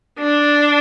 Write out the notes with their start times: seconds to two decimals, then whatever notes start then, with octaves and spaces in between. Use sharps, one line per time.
0.19 D4